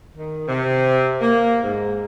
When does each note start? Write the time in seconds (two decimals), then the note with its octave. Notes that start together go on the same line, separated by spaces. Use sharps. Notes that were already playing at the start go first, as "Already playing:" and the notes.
0.16 D#3
0.48 C3
1.21 A#3
1.62 G#2